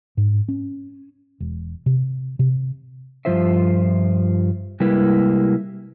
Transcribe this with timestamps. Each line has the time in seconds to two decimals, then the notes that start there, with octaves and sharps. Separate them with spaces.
0.17 G#2
0.48 C#4
1.40 E1
1.86 C3
2.39 C3
3.25 G2 E3 F3 F4 C5 E5
4.80 C3 G3 G#3 A#3 E4 B4